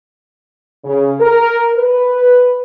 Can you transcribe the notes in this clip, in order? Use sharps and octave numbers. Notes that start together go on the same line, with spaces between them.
C#3
A#4
B4